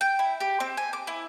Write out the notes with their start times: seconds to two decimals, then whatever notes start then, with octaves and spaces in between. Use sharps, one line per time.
0.01 G5
0.19 E4
0.40 G4
0.60 C4
0.77 G#5
0.93 D6
1.07 E4